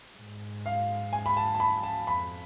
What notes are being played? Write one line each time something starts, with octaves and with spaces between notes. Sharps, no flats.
G#2
F5
G#5
B5
A5
A5
B5
A5
F2 B5